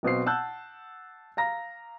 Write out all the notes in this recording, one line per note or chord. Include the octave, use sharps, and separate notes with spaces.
B1 B2 C4 C7
F#5 A5 E6 F#6 G6
F5 A#5 A#6